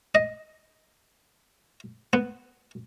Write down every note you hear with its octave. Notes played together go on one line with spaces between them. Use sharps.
D#5
B3